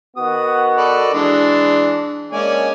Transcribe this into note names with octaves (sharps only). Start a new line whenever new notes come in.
D#3 B3 F#4 D#6
A4 B4 D5
E3 G#3 D4
G#3 A#3 C#4 D4 D5 G#5